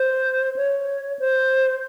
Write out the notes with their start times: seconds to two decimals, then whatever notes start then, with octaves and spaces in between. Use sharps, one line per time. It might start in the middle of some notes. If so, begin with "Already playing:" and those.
Already playing: C5
0.56 C#5
1.19 C5